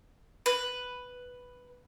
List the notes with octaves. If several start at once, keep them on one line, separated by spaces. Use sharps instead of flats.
B4